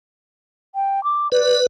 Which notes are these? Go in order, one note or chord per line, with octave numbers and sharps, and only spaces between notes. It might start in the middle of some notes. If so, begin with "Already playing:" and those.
G5
D6
B4 D5